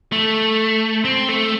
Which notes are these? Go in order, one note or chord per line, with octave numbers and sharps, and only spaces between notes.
A3
C4
A3